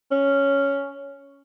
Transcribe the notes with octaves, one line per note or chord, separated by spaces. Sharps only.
C#4